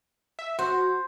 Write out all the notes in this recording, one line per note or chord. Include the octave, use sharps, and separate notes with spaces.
E5
F#4 C5